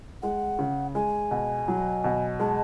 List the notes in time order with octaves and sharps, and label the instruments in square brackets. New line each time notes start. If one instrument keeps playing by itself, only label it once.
[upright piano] G#3 [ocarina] F#5
[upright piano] C#3
[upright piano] G#3 [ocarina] G#5
[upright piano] B2
F#3
B2
[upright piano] G#3 [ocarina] A5